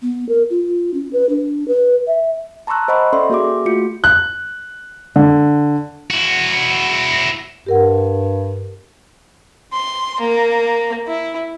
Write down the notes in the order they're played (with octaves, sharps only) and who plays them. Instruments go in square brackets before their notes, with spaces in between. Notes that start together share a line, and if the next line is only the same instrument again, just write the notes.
[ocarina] B3
A#4
F4
C#4
B4
D4
B4
E5
[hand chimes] A5 A#5 C6 C#6 E6 F#6
C5 D#5 F#5 B5 C#6
C#4 A4 D5 E5 C6
A#3 F#4 G#4 E5 D6
A3 F4 F#4 C#7
[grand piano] F#6
D3
[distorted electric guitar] E4 F#4
[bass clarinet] G2 [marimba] G4 A#4 F#5
[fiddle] C6
A#3
E4